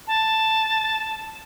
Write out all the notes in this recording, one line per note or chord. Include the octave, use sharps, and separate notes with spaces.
A5